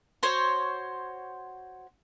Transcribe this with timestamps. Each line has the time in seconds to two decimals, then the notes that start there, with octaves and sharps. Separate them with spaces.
0.23 F#4 C5 C#5